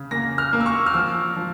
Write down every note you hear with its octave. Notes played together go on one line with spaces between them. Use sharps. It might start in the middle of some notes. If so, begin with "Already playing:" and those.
Already playing: C#3
A#3 A#6
F6
A#3
E6
C#6
F6
F3 E6
F3